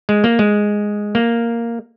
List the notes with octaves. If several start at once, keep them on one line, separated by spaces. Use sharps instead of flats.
G#3
A#3
G#3
A#3